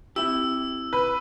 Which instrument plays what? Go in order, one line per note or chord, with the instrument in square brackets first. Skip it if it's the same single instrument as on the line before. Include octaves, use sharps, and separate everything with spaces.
[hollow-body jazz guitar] C4 E4 G4 [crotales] E6
[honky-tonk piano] B4